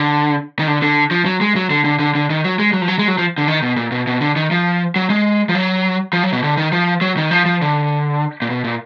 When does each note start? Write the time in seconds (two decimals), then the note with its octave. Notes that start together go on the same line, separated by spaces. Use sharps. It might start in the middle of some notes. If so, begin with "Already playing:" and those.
Already playing: D3
0.59 D#3
0.67 D3
0.82 D3
1.11 F3
1.25 F#3
1.41 G#3
1.56 F#3
1.70 D3
1.85 D3
1.99 D3
2.15 D3
2.30 D#3
2.44 F#3
2.59 G#3
2.73 F#3
2.82 F3
2.88 F#3
2.99 G#3
3.08 F#3
3.18 F3
3.38 D3
3.48 D#3
3.62 B2
3.76 A#2
3.92 B2
4.07 B2
4.21 D3
4.36 D#3
4.51 F3
4.96 F#3
5.10 G#3
5.49 F3
5.55 F#3
6.13 F3
6.23 F#3
6.32 B2
6.43 D3
6.57 D#3
6.72 F3
7.01 F#3
7.17 D#3
7.31 F3
7.46 F3
7.62 D3
8.42 A#2
8.50 B2
8.64 A#2